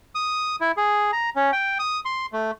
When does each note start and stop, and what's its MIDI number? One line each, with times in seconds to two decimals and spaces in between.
0.15 0.56 87
0.61 0.72 64
0.77 1.11 68
1.13 1.30 82
1.36 1.51 61
1.53 1.78 79
1.79 2.00 87
2.05 2.26 84
2.33 2.51 57